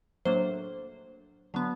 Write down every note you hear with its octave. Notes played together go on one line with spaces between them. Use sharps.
A2 F#3 A#3 D4 C5
D3 F#3 B3